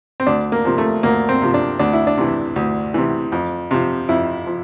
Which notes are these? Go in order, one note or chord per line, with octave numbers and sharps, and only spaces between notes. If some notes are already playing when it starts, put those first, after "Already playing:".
C4
D2 D4
A#3
C3 F3
A3
D2 A#3
C4
C3 F3
D4
D2 D4
E4
D4
C3 E3
D2
C3 E3
F2
C3 F3
F2 E4
F3